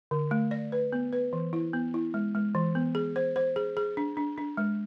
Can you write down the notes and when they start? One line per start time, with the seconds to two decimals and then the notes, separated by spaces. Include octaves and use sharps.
0.11 D3
0.31 A3
0.51 D5
0.72 B4
0.93 B3
1.13 B4
1.33 E3
1.53 E4
1.73 B3
1.94 E4
2.14 G#3
2.35 G#3
2.55 E3
2.75 B3
2.95 G#4
3.16 C5
3.36 C5
3.56 G#4
3.77 G#4
3.97 D4
4.17 D4
4.38 D4
4.57 G#3